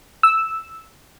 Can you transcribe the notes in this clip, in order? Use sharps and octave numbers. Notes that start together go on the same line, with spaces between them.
E6